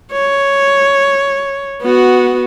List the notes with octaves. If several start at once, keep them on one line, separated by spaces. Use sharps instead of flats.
C#5
B3 F#4